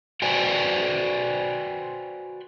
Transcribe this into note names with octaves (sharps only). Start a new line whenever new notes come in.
F#4 B4 C5 D5 G5 G#5